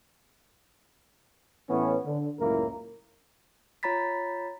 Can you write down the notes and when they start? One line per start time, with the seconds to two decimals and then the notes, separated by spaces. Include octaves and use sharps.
1.70 A2 E3 B3 C#4
2.06 D3
2.40 C#2 F#2 A2 A#3 E4 A#4
3.83 F4 C#5 A#5 B5 A6 B6